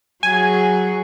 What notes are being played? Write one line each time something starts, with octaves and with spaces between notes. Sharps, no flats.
F#3 F#4 G#4 G#5